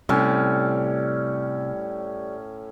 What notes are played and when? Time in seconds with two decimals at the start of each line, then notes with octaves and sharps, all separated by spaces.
0.09 A2 C3 G3 C#4